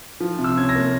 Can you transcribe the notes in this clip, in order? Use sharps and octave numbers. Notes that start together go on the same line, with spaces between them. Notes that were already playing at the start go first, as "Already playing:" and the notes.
F3
C3
E6
C#4 G#6
A#6
A#3